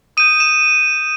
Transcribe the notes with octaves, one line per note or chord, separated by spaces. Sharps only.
D#6 G6 D#7
E7